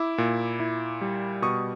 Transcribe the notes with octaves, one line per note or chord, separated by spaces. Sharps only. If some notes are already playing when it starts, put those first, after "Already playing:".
Already playing: E4 D6 E6
A#2
E4
G3
B2 C#6 D#6